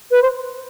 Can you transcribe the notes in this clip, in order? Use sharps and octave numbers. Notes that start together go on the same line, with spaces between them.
B4
C5